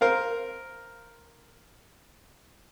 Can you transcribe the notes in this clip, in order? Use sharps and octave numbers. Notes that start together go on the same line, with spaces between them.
A#4 C5 F5